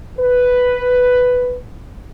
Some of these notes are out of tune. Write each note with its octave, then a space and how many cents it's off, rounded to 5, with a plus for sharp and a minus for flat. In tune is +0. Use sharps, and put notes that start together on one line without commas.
B4 +5